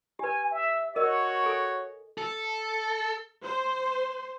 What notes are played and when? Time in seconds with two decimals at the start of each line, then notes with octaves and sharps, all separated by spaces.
0.19 G4 B4 G#5
0.51 E5
0.96 F#4 A#4 C#5 D#5
1.44 A4 G#5
2.18 A4
3.42 C5